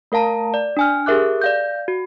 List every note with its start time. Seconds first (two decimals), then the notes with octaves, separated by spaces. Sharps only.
0.12 A3 A#4 F5 A5 A#5
0.54 D5
0.77 D4 G#5 F6
1.06 G4 G#4 A#4 E5 D6 F#6
1.41 D5 F5 G6
1.88 F#4